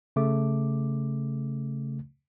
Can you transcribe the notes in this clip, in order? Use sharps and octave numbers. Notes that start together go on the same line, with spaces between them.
C#3 A3 D6